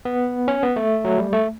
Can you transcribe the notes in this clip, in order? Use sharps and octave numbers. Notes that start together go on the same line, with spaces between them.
B3
C#4
B3
A3
F#3
G3
A3